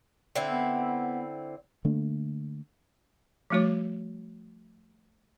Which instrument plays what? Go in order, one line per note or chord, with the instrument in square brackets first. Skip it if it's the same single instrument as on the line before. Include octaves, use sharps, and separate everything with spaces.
[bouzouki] D3 C4 E4
[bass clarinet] B3
[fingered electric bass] D3 A3 A#3 D4
[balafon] F3 G3 A3 F#4 C#5